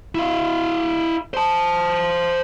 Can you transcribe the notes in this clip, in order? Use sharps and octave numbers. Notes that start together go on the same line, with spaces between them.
E4 F5
C5 A5